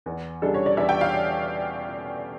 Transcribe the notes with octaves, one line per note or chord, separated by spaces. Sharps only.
E2
C#3 G3 D4 A4
C#5
D5
E2 E5
G5
F5